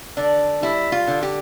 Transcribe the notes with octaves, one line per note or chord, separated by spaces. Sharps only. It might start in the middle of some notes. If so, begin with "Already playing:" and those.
D3 D4
G3 E4
F4
D3
G4